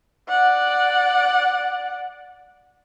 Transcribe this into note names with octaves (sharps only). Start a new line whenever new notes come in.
D5 F#5